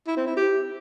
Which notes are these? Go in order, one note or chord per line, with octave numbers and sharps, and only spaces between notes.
E4
C4
E4
G4